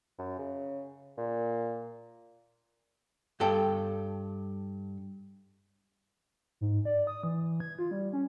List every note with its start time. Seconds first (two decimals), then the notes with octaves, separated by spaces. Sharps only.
0.18 F#2
0.38 C#3
1.17 A#2
3.40 G2 A4 G5
6.61 G#2
6.85 D5
7.07 D#6
7.23 E3
7.60 G#6
7.79 F4
7.91 G3
8.13 C#4